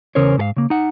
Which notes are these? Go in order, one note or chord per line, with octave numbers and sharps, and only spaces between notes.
E2 C#3 C#4 A#4 C5 C#5
G#2 A4 F5
C#3 A#3
D#4 F#5